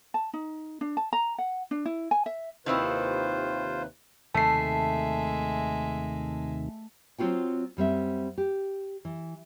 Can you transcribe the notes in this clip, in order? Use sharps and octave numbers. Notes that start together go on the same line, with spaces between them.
A5
D#4
D4
A5
A#5
F#5
D4
E4
G#5
E5
D#2 C3 D#3 C4 E4 F4 B4 C5
D#2 C3 D#3 G#3 A3 E5 A5 C7
F#3 C4 F4 F#4 G5
F#2 G3 C4 E5
G4
E3